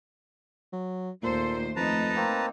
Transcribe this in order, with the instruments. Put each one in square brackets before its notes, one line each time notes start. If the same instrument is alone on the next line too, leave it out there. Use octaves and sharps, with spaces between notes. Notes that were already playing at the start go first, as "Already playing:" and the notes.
[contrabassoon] F#3
[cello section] D#2 A3 C5 [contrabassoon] A#2 [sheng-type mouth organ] A4
[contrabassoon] F2 [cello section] A3 D#4 [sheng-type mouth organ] B4 A5 A#5
[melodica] A#3 C4